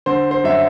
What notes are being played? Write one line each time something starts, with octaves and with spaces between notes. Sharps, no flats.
D3 C5
C5
F#2 E5